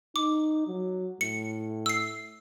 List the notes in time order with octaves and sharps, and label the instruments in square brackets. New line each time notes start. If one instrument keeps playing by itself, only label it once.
[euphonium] D#4 [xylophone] D6
[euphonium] F#3
[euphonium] A2 [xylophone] C#7
[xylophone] E6 C7